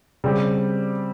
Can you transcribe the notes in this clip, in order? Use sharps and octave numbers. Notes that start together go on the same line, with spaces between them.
C#3 G3 C4 G4